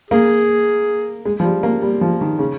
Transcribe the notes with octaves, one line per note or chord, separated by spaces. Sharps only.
A#3 G#4
G#3
F3
G3
A#3
G3
F3
D#3
C#3